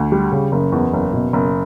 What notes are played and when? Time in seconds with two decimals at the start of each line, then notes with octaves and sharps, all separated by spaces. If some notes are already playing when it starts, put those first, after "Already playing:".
Already playing: D2
0.12 G3
0.32 C#3
0.52 F#1
0.72 E2
0.93 F#1
1.13 B2
1.33 F#1